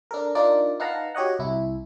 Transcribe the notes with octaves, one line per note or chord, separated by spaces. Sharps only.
D4 A4 A#4
D4 D#4 F4 A#4 D5
D#4 B4 F5 F#5 A5 A#5
F#4 G4 C#5 D#5 F#5
C2 E4